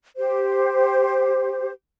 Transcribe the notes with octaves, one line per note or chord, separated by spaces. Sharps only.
G4 C5